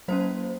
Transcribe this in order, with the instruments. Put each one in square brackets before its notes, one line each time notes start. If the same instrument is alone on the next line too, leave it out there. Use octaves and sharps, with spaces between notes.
[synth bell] F#3 A#3 C#4 C5